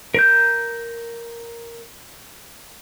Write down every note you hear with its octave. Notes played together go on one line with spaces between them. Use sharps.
A#4 G6